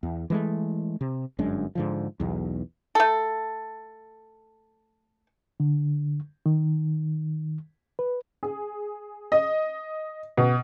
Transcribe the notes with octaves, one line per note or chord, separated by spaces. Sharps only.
E2
E3 G#3 A3
C3
G1 F#2 G#3 D4
G#2 D3 F3
B1 E2
A3 A4
D3
D#3
B4
G#4
D#5
B2